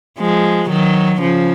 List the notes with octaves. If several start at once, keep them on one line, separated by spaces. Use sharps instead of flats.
F3 G#3
D#3 F#3
C#3 F3